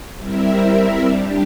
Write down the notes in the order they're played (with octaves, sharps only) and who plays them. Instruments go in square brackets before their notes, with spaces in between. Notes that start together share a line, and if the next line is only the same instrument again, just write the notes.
[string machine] G3 C4 E4 A#4 E5
G3 D4 G4